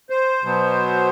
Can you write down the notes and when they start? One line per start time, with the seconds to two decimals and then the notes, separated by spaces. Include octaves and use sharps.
0.10 C5
0.43 B2 F#3 B3